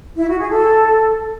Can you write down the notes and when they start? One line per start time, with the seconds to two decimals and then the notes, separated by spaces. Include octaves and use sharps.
0.16 E4
0.28 F#4
0.39 G#4
0.50 A4